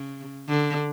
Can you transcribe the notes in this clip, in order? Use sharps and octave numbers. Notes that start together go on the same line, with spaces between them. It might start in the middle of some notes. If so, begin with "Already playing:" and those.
Already playing: C#3
D3